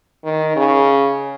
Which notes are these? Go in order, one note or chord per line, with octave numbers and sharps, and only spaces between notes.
D#3
C#3